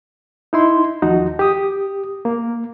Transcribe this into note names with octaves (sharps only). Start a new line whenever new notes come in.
D#4 E4 C6
D#2 F3 D#4 F#4
G4 D#6
A#3